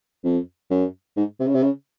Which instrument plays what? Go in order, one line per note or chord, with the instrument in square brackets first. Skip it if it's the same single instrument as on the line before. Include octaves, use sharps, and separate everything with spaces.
[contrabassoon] F2
F#2
G#2
C3
C#3
C3
C#3